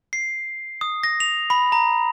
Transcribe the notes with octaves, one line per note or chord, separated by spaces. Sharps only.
C7
D#6
A#6
F7
B5
A#5